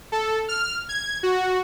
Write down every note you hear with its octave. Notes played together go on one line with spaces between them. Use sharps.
A4
F6
G#6
F#4